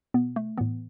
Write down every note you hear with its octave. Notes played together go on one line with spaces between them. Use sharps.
B2 B3
A3
A2 E3 B3